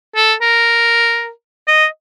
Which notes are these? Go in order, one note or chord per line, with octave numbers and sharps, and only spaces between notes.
A4
A#4
D#5